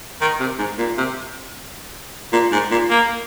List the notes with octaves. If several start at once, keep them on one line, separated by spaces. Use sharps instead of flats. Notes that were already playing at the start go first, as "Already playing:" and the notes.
D#3
C3
G#2
A#2
C3
A#2
G#2
A#2
A#3